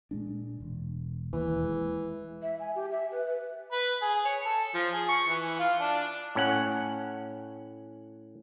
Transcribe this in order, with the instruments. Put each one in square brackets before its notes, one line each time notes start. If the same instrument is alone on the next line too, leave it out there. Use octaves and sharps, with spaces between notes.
[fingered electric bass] A#2 G#3 D4
E1
[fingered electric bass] E1 D#2 [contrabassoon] E3
[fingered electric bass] G#3
[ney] E5
G#5
G4
E5
B4
B4
[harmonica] B4
G#4
C#5
A4
F3
G#4
C#6
E3
F4
D4
[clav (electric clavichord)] A2 C#4 F#5